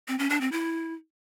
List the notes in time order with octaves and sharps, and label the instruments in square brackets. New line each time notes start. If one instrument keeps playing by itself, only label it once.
[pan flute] C4
C#4
D4
C4
E4